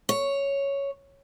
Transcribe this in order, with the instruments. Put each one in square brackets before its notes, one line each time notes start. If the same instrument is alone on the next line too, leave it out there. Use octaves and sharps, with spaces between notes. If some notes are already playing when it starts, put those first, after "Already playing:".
[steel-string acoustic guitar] C#5